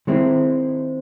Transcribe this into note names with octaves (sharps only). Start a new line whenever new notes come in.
D#3 G#3 C4 E4